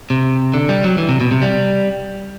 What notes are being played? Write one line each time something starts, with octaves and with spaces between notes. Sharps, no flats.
C3
D3
G3
F#3
E3
C3
B2
C3
G3